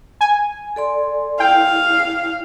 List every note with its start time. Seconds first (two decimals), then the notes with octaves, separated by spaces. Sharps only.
0.21 G#5
0.76 A4 D5 C6
1.40 E4 F5 G5